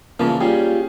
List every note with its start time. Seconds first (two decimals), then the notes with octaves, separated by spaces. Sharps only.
0.20 A#2 C#3 E3 F3 A#3
0.41 G3 C#4 F4 G4 G#4